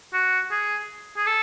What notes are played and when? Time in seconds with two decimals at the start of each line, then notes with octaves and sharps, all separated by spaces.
0.13 F#4
0.51 G#4
1.17 G#4
1.26 A4